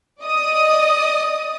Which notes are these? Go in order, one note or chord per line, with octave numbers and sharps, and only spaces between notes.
D5 D#5 D#6